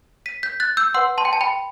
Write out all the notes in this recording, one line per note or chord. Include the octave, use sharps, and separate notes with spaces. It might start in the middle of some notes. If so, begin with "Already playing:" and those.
B6 D#7
G6 B6
F#6 A6
E6 G6
B4 F#5 C6 E6
A5 C6
G5
A5
G5 B5